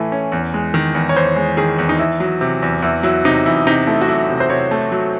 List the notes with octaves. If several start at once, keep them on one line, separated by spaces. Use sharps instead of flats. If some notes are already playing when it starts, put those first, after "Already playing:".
Already playing: A2 E3 A3
C#4
E2
G#3
D#3
E2
C#5
E2 C5
G#3
D#3 G#4
E2
D#4
E2 E4
F#3
C3
E2
E2 E4
F#3 E4
C3 D#4
E2 E4
C3 D#4
A3 E4
F#4
F#3 E4
C3
C5
C3 C#5
A3
F#3